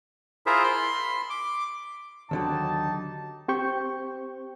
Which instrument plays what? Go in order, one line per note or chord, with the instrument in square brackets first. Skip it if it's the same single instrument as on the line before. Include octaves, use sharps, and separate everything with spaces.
[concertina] E4 F4 G#4 A#4 C5 E5
B5 C6
D6
[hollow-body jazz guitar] D#2 D3 F#3 [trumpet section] D#4 G4 A5
[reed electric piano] C4 G4 C5 G5 C#6 G6